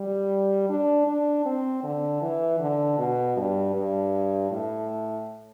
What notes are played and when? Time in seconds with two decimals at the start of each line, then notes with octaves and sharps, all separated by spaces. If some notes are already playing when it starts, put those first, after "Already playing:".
Already playing: G3
0.69 D4
1.07 D4
1.46 C4
1.84 D3
2.22 E3
2.60 D3
2.99 B2
3.37 G2
3.74 G2
4.51 A2